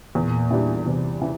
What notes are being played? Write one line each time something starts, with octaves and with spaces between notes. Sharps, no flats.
E2 A#2
E3 G3 D4
E2 C3
E3